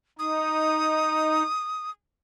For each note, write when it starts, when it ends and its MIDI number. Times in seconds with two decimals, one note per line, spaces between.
0.19 1.43 63
0.19 1.90 87